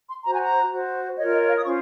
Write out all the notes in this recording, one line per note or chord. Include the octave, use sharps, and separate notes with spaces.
C6
F#4 C5 A#5
G#5
A#5
F#4 C5
F4 A#4 C#5 D#5
D#5
F5
D#6
C#4 F4 C5 C#6